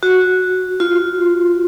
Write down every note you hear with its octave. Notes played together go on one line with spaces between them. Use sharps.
F#4
F4